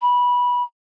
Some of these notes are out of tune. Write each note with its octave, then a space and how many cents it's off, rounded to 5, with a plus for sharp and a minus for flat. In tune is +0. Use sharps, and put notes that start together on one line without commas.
B5 -15